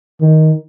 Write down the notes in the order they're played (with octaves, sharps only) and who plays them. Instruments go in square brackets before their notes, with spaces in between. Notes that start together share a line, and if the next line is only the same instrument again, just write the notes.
[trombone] D#3